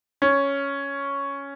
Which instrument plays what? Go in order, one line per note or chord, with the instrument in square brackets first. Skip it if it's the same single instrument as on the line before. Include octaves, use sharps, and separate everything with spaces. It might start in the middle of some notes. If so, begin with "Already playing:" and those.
[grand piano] C#4